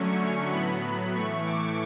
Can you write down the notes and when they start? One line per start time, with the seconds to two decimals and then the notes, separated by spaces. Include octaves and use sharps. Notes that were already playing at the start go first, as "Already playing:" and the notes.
Already playing: D3 F#3 A3 C#4 C#6
0.51 A2 F#3 B3 B5
0.82 B5
1.14 A2 E3 A3 C#6
1.45 D6